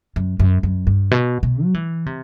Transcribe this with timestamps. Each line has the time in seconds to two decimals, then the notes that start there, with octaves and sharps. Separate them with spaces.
0.16 F#2
0.39 F#2
0.63 F#2
0.87 G2
1.11 B2
1.43 B2
1.63 F#3
1.74 E3
2.06 C3